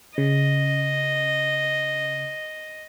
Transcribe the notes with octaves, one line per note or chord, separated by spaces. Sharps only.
C#3 D#5